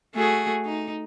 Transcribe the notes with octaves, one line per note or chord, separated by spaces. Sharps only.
A3 F#4 G#4
D#4